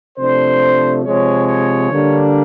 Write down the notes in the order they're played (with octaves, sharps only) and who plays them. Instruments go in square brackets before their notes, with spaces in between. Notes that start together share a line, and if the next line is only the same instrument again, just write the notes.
[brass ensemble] C3 F3 A3 D4 C5
C3 F3 G#3 C#5
C#5
D3 G3 A#3 D4